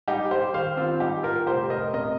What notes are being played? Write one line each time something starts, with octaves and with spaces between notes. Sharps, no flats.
G3 D#4 G4
G4 C5
D#3 C5 F5
C4 F4
G3 D#4 G4
F4 A#4
F1 G4 C5
A#4 D#5
C3 A#4 D#5